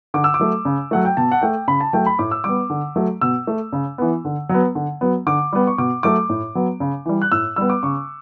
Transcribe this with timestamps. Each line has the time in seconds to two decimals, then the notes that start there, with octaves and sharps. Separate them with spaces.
0.14 D3 D6
0.24 E6
0.34 D6
0.39 F#3 A3
0.65 C#3
0.91 F#3 A3 F#5
1.05 G5
1.17 B2 A5
1.32 F#5
1.42 A3 G5
1.68 C#3 B5
1.81 A5
1.93 F#3 A3 G5
2.06 B5
2.19 A2 D6
2.31 E6
2.44 G3 B3 D6
2.70 D3
2.96 F#3 A3
3.21 B2 E6
3.47 A3
3.73 C#3
3.98 E3 B3
4.25 D3
4.49 F#3 B3
4.75 D3
5.01 F#3 B3
5.27 D3 D6
5.53 G3 B3
5.67 C#6
5.78 B2 D6
6.03 F#3 A3 D6
6.29 A2
6.55 F#3 B3
6.80 C#3
7.05 E3 G3
7.22 F#6
7.32 A2 E6
7.56 G3 B3 E6
7.70 D6
7.83 C#3 C#6